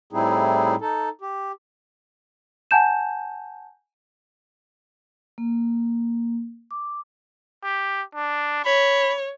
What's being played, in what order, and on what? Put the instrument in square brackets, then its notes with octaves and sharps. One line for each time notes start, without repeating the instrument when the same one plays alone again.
[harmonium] A2 G3 C4 D#4 E4 G#4
D#4 A4
G4
[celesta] F#5 G#5 A5 G6 E7
[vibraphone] A#3
D6
[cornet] G4
D4
[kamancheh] C#5 [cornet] B5